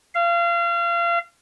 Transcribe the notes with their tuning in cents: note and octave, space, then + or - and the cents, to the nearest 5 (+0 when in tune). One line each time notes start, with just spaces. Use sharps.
F5 -30